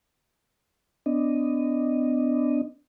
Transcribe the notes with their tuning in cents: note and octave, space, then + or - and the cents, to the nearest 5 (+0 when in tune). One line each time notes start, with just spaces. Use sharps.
B3 +35 D4 +0 D#5 -5